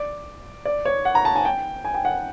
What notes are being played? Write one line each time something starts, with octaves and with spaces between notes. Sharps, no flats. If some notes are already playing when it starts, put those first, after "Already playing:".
Already playing: D5
D5
C#5
F#5
A#5
A5
G#5
G5
G#5
G5
F#5